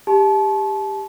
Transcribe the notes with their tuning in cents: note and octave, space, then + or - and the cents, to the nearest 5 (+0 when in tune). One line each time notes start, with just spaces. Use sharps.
G4 +15 A5 -30